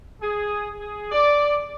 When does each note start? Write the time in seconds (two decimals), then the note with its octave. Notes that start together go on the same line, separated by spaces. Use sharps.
0.22 G#4
0.80 G#4
1.11 D5